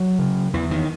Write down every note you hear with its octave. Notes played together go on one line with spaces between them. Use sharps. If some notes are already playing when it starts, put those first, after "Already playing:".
Already playing: F#3
C#3
E2 E3
D#3